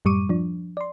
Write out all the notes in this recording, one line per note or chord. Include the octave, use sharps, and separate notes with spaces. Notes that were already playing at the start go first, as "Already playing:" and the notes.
F#2 A2 G3 C#6 D6 D#7
F3 D4
D5 C6